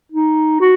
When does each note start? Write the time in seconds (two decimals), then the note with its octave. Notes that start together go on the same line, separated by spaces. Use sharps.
0.12 D#4
0.60 F#4